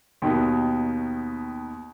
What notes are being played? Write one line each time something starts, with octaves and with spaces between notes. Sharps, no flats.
D#2 B2 D#3